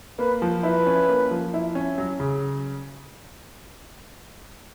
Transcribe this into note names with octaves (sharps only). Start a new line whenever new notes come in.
A#3 B4
F3
E4 B4
C#4
A#3
F3
E4
C#4
F#3
C#3